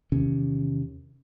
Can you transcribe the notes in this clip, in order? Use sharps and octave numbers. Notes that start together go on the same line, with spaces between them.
E2 C3 D#3 C#4